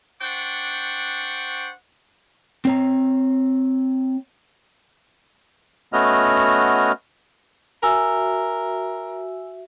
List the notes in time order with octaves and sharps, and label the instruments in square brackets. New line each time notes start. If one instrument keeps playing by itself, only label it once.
[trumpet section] D4 C5 F#5 G5 C#6
[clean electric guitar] C4 C#5 A#5
[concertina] A3 B3 C#4 F#4 D#5 F6
[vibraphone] F#4 E5 [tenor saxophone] A#4 [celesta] G#5 E6